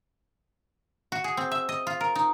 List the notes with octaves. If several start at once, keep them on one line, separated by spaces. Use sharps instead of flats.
F#4
G#4
C4
E5
D#5
F4
A#4
D#4